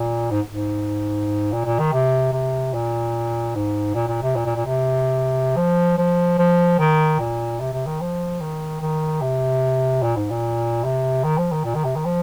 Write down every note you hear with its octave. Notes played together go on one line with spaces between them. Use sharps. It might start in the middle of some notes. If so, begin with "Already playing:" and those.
Already playing: A#2
G#2
G#2
A#2
A#2
D#3
C3
C3
A#2
G#2
A#2
A#2
C3
A#2
A#2
A#2
C3
F3
F3
F3
D#3
A#2
C3
C3
D#3
F3
D#3
D#3
C3
A#2
G#2
A#2
C3
D#3
F3
D#3
A#2
D#3
C3
D#3
F3